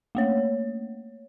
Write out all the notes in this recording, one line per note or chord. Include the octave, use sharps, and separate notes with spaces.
A3 A#3 C#5